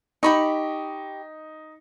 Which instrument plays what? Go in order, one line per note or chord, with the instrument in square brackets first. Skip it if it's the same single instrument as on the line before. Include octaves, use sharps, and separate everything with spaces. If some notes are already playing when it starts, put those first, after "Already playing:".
[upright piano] D#4 [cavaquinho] G4 B5 C#6